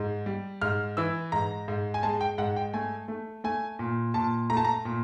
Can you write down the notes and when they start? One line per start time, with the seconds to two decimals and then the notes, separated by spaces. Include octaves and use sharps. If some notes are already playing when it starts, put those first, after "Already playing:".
Already playing: G#2
0.26 G3
0.61 G#2 F6
0.97 E3 E6
1.32 G#2 A#5
1.68 G#2
1.94 G#5
2.03 G#3 A5
2.21 G5
2.38 G#2 F#5
2.56 G5
2.74 A3 G#5
3.08 A3
3.44 A3 G#5
3.79 A#2
4.14 A#2 A5
4.50 A3 A#5
4.57 A5
4.65 A#5
4.85 A#2